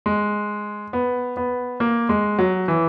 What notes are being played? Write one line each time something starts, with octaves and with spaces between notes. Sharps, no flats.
G#3
B3
B3
A#3
G#3
F#3
E3